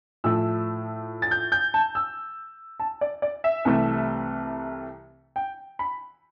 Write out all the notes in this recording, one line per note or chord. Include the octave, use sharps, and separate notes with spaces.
A2 F3 A3 E6
A6
G6
G6
A5
E6
A5
D5
D5
E5
C2 C3 E3 A3
G5
B5